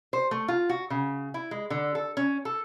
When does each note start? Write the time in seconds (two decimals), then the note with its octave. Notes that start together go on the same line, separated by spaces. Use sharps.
0.13 C5
0.31 A3
0.48 F4
0.69 F#4
0.90 C#3
1.34 E4
1.51 G#3
1.70 D3
1.95 A4
2.17 C#4
2.45 A4